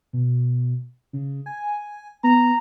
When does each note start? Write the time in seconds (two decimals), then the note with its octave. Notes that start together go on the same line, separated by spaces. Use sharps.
0.13 B2
1.13 C#3
1.46 G#5
2.23 B3 A#5